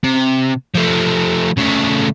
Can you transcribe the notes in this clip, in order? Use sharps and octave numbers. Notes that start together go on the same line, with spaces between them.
C3
F3 A3
C#3 A3